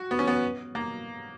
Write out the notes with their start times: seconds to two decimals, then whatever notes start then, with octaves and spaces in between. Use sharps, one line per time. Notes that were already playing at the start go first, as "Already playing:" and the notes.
Already playing: F#4
0.11 B3
0.19 C#4
0.27 B3
0.75 A#3